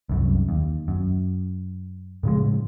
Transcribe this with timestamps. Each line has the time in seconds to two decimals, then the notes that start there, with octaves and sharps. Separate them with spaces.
0.09 C2 F#2
0.49 D#2
0.88 F#2
2.23 A2 C#3 F3 G#3